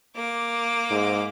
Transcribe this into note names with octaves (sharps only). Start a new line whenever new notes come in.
A#3 D6
G#2